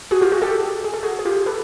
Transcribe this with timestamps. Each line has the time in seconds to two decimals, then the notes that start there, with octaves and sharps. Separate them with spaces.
0.11 F#4 G#4
0.21 F4 G4
0.32 F#4 G#4
0.42 G4 A4
0.84 G#4
0.94 A4
1.03 F#4 G#4
1.19 G#4
1.25 F4 G4
1.46 A4 B4